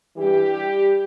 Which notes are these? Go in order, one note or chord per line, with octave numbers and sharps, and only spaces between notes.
G2 E3 G3 G4